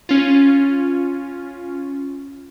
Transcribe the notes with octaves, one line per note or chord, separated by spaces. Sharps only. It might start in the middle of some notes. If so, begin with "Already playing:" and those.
C#4 F4